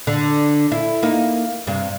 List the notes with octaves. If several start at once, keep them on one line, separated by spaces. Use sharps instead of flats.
D3
E4
A#3 D#4
G2 C3